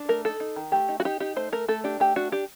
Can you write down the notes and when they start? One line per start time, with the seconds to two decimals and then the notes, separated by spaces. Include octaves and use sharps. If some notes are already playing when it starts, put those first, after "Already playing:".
Already playing: D4
0.09 A3 A#4
0.25 D#4 A4
0.40 D#4
0.56 D#3
0.72 A3 G4
0.89 D#4
1.00 F#4
1.05 D#4 G4
1.20 D#4 G4
1.36 A3 C5
1.52 A3 A#4
1.68 A3 A4
1.84 D4 G4
2.00 A3 G4
2.16 D4 F#4
2.32 D4 G4